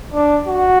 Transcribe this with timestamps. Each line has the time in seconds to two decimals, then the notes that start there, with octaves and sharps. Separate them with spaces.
0.14 D4
0.47 F#4